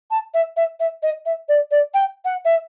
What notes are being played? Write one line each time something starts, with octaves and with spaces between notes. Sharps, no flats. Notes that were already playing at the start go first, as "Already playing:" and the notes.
A5
E5
E5
E5
D#5
E5
D5
D5
G5
F#5
E5